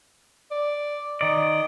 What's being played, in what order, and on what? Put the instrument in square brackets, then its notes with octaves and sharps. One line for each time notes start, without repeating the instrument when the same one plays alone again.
[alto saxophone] D5
[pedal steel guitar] D#3 D5 [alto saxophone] D#5